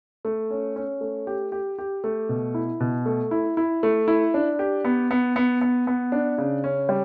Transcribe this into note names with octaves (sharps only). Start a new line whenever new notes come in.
A3
C#4
C#4
A3
G4
G4
G4
A3
B2
E4
B2
A3
E4
E4
A3
E4
D4
G4
B3
B3
B3
B3
B3
D4
C#3
C#4
G3